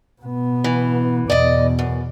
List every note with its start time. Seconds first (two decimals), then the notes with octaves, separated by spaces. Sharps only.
0.22 B2 B3
0.64 E3
1.30 E2 B2 D5 D#5
1.79 F#2